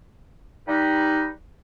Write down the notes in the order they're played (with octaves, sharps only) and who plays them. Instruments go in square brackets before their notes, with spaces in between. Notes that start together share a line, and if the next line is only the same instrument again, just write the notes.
[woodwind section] G3 D#4 B4